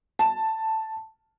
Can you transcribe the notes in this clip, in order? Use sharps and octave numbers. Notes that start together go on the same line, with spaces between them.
A5